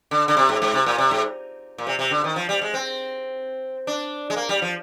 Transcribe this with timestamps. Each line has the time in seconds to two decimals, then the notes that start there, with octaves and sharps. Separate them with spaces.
0.11 D3
0.28 D3
0.37 C3
0.49 G#2
0.62 G#2
0.74 C3
0.86 A#2
0.98 C3
1.11 G#2
1.78 A#2
1.87 C3
1.99 C3
2.11 D3
2.24 D#3
2.36 F3
2.49 G3
2.62 G#3
2.74 C4
3.87 D4
4.30 G#3
4.36 A#3
4.49 G3
4.62 F3